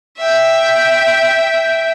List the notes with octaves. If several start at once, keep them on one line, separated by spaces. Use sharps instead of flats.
E5 G5